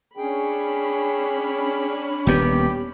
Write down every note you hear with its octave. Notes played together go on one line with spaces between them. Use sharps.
C#4 D4 G#4 G5 B5
D#1 D#2 B3 G4